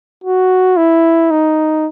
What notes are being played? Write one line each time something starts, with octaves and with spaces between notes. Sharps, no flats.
F#4
E4
D#4